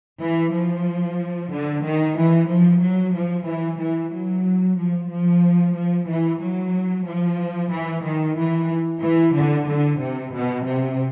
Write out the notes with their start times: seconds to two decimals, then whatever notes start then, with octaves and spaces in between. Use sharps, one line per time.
0.21 E3
0.53 F3
1.52 D3
1.84 D#3
2.18 E3
2.49 F3
2.82 F#3
3.15 F3
3.47 E3
3.80 E3
4.13 F#3
4.78 F3
5.11 F3
5.75 F3
6.08 E3
6.41 F#3
7.06 F3
7.72 E3
8.04 D#3
8.37 E3
9.02 E3
9.35 D3
9.68 D3
10.00 C3
10.34 B2
10.65 C3